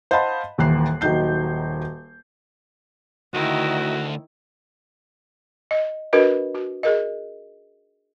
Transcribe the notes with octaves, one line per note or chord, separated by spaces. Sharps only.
C5 D#5 F5 F#5 A5 B5
D#1 D#2 E3 F#6 C7
D#1 D#3 F#3 D#4 G6 C7
D2 D#3 E4 F#4
D#5
D4 F#4 A#4 B4 D#5
F#4
G#4 A#4 D#5